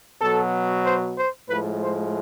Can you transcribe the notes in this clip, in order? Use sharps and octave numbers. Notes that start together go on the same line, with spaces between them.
B2 F#3 A4
C5
C5
A2 F3 G#3 B4
C5